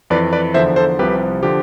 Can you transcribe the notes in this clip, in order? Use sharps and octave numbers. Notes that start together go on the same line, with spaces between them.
F2 E3 B4 D5
B4 D5
E2 D3 F3 C5 E5
A4 C5
C2 C3 F3 G4 B4
D3 F3 G4